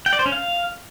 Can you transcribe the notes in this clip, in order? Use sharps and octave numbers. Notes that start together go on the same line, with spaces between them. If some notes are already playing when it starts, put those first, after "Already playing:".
G5
D5
C5
C#4
F5